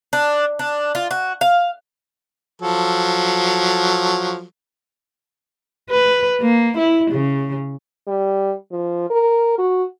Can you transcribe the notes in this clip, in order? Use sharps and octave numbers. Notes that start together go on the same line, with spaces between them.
D4
D4
F4
F#4
F5
F3 F#3 A4
B4
A#3
E4
C#3
G3
F3
A#4
F#4